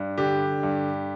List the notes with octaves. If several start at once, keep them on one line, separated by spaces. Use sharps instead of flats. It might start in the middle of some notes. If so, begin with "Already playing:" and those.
Already playing: G2
D3 G4
G2